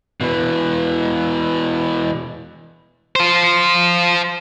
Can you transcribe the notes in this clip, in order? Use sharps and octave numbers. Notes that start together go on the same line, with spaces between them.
B2 E3
F4 C5